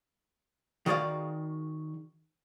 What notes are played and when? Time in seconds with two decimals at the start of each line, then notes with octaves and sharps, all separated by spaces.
0.86 D#3 F#4 G#4 D5 F5